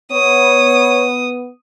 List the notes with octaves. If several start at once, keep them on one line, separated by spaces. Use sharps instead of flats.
B3 C#5 D#6